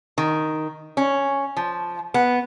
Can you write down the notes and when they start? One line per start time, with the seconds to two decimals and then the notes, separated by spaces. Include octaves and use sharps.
0.18 D#3
0.97 C#4
1.57 F3
2.14 B3